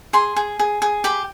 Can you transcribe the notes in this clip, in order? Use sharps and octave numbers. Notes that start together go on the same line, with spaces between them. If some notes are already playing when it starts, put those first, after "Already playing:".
G#4 C6
G#4
G#4
G#4
G4 B5